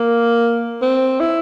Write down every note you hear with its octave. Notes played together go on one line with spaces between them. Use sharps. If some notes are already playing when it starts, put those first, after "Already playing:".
Already playing: A#3
C4
E4